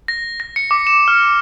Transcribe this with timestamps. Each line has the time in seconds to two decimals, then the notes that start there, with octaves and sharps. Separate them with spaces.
0.08 A#6
0.40 A#6
0.56 C#7
0.71 D6
0.87 E7
1.08 F6